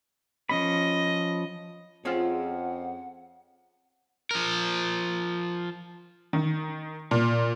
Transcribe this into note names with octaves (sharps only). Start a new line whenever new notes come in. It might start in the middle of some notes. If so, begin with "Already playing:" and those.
F3 C#4 D#5 B5
F2 C4 C#4 F4 G#4 F#5
F3 A#4
D#3
A#2